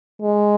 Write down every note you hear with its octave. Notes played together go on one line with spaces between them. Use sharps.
G#3